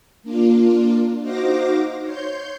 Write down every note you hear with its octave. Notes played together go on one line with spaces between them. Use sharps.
A#3 D4 F4
D#4 F#4 C5 F5 D6 A#6
C#5 C6 G6